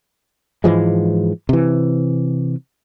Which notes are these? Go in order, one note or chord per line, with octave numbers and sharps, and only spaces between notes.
G#2 E3 F3 G#3
C3 E3